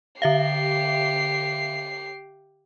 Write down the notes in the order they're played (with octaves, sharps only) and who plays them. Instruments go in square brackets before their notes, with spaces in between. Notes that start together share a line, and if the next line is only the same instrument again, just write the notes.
[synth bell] D3 E5 F5 [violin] G4 C7